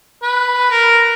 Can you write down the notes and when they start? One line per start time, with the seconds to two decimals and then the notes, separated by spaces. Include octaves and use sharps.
0.22 B4
0.71 A#4